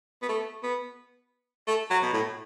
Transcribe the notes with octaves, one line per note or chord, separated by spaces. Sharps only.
B3
A3
B3
A3
F#3
B2
A2